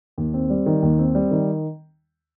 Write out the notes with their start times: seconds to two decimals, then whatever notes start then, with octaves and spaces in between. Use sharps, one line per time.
0.18 D#2
0.34 C4
0.50 G3
0.66 D#3
0.83 D#2
0.99 C4
1.15 G3
1.31 D#3